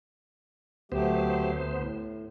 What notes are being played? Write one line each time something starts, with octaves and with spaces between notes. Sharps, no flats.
D2 F#3 A3 B3 G4 C5
A2